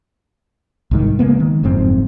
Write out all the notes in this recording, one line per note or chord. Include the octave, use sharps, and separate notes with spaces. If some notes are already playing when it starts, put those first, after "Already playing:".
C2 G#2 D#3
C#3 G#3 A#3 B3
D#3
F#1 F2 G#2 C4